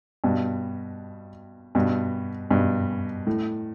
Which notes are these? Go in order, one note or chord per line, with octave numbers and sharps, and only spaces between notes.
G2 B2
G2 B2
G2 B2
A2